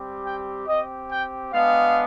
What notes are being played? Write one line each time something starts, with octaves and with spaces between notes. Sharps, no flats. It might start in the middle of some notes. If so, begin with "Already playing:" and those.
Already playing: G3 C4 G4
G5
C4 G4 D#5
G5
G#3 B3 D4 F5